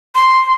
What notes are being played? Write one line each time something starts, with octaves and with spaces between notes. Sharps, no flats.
C6